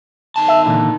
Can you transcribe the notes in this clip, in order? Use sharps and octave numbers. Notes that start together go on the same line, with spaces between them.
D#3 A5
E5
A#2 D3 E3